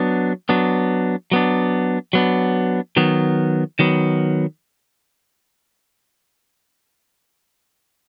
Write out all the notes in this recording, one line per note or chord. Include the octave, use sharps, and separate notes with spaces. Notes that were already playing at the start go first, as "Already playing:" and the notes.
Already playing: F#3 B3 D4
F#3 B3 D4
F#3 B3 D4
F#3 B3 D4
D#3 F#3 B3
D#3 F#3 B3